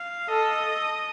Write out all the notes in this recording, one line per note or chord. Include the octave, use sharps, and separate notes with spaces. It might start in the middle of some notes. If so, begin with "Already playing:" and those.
Already playing: F5
A4 D#5